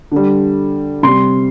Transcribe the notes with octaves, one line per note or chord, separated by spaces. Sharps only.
D3 G3
C3 G3 C6